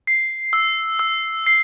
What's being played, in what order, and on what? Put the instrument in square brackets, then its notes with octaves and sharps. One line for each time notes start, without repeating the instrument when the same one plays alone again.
[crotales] C7
E6
E6
C7